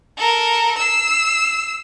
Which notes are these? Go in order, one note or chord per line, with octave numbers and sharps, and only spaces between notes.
A4 A#4
E6 C7